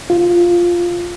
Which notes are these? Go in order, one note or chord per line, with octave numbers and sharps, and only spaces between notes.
F4